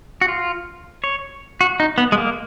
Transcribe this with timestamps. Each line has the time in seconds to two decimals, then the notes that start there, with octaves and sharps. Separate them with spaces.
0.21 F#4
0.28 F4
1.04 C#5
1.61 F#4
1.80 D#4
1.98 B3
2.12 G#3
2.18 A#3